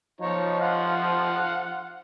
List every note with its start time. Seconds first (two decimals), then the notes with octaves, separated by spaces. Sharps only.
0.21 F3 D#4 C#5
0.61 F5 F#5 C6